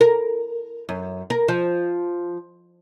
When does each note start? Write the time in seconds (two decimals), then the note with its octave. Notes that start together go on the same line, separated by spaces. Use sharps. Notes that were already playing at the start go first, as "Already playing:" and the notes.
0.01 A#4
0.89 F#2
1.30 A#4
1.48 F3